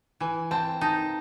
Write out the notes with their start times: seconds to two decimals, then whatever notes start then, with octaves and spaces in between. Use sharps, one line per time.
0.20 E3 G#5
0.51 C4 A5
0.81 D#4 A5